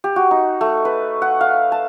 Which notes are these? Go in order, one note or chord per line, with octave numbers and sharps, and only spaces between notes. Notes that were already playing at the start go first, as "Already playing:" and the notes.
G4
F#4
D#4
A3
B4
F#5
F5
A5